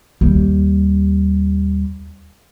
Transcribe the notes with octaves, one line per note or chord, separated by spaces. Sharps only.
D#2 G3